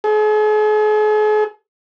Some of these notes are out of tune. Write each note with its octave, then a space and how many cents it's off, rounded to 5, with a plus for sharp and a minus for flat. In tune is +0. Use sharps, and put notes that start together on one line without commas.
G#4 +45